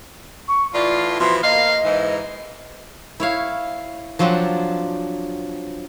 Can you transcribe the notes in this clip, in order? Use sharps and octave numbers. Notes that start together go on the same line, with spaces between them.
C#6
A2 E3 F4 D5
B2 E3 F3 C6
A#3 D#5 F5
G#2 E3
E4 C#5 F5
F3 F#3 C4 D4 F#5